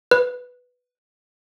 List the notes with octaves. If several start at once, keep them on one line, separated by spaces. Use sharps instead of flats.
B4